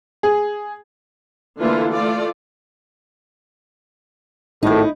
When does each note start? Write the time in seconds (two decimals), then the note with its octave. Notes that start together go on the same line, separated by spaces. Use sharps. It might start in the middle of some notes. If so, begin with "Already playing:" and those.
0.23 G#4
1.60 D3 E3 A3 A#3 E4 F4
1.92 A3 F4 D5
4.63 G#1 A2 D#4 E4 A4